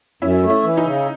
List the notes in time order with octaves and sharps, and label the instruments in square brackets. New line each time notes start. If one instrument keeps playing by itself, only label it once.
[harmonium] F#2 [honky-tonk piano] C#4 E4
[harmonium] A3
[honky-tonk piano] C#4 E4
[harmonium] E3
[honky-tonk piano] D#4
[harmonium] C#3